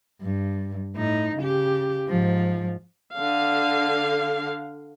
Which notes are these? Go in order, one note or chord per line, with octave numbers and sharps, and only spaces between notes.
G2
A2 D#4
C#3 G4
G#2 F3
D3 F5